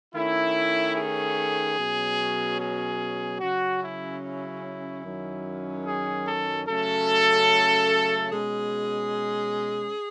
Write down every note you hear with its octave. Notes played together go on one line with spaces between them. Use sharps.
D#3 A3 C#4 E4
G#4
B2 F#3 C#4
G#4
C#3 F#3 C#4 F#4
E4
E4
F#2 D#3 F#3 C#4
G#4
A4
C#3 F#3 A3 C#4 A4
B2 G#3 C#4 G#4